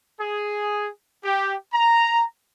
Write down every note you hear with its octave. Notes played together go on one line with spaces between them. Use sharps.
G#4
G4
A#5